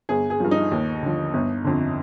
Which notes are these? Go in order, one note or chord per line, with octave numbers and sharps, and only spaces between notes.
G1 G#4
G#4
G2 F3
D#4
D#2
D3 F3
G1
F2 D3